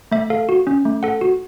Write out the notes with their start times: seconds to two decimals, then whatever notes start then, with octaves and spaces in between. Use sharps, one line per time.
0.12 A3 E5
0.30 A4 F5
0.49 F#4
0.67 C#4
0.85 A3
1.03 A4 F#5
1.21 F#4